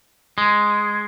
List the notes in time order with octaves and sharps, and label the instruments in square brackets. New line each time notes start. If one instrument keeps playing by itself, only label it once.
[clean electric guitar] G#3